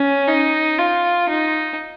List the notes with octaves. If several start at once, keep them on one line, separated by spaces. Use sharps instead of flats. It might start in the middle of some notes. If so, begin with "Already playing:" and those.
Already playing: C#4
D#4
F4
D#4